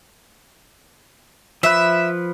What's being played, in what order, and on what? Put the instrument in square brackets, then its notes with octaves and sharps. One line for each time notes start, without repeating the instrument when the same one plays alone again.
[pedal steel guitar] F3 B4 [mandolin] E5